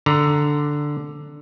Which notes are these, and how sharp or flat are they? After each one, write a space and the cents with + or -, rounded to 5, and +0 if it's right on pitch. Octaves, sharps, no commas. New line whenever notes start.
D3 +0 A#5 +0